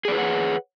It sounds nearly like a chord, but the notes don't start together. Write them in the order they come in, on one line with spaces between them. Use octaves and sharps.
G#4 D5 B4 C#5 F#5